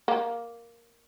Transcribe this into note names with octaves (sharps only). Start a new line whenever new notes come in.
A#3